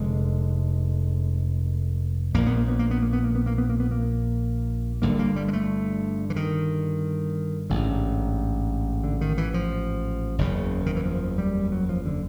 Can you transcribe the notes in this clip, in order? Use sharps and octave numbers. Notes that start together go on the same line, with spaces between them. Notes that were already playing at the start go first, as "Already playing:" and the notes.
Already playing: F1 F2 D3 G#3
A#1 A#2 A#3
B3
A#3
B3
A#3
B3
A#3
B3
A#3
B3
A#3
B3
A#3
B3
A#3
G1 G2 D3 A#3
A#3
G3
G#3
A3
E3
D#3
A1 G#2 D3
D3
D#3
E3
F3
F#1 E2 C#3
D#3
E3
F3
G3
F#3
F3
D3